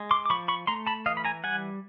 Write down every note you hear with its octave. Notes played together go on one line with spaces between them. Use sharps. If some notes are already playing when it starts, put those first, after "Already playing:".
Already playing: G#3
C6 D6
D6
F3 B5 C#6
B5 C#6
A3 A#5 C6
A5 B5
E3 D#5 F5
B5
G#5 A#5
G3 F#5 G#5